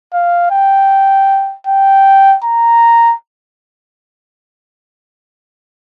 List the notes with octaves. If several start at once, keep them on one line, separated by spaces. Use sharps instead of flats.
F5
G5
G5
A#5